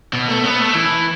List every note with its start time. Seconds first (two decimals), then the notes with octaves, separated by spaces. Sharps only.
0.13 B2
0.28 A3
0.43 B3
0.59 A3
0.75 E3